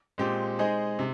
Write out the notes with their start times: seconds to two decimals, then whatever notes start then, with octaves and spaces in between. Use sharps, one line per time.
0.18 A#2 G#3 C4 G4
0.59 G#3 D#4 G#4 C5 D#5
0.99 C3